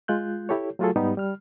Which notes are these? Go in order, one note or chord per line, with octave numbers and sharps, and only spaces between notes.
G#3 F4 F#6 G6
E4 G4 A4 C#5
F#3 A3 F4 F#4 G#4 A4
G#2 G3 B3 D#4 G4
G3 F6